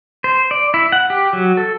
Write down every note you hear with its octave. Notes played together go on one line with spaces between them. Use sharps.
C5
D5
E4
F#5
G4
F#3
A4